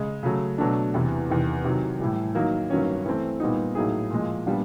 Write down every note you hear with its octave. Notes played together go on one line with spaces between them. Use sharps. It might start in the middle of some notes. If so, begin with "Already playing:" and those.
Already playing: C#3 G#3
C#3 F#3 A3
B2 F#3 A3 D4
E2 C3 E3
E2 C3 D#3
C3 D#3 F#3
A2 E3 G3
D#3 F#3 A#3 D#4
G2 D#3 F#3 A#3 C#4
E3 A3 C4
A#2 G3 B3 D#4
A2 F#3 A#3 D#4 G#4
A#2 F3 G#3
A#2 G3 B3 D4 F4